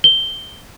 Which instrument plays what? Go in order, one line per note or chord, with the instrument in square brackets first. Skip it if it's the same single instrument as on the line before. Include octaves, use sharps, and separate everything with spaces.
[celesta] G7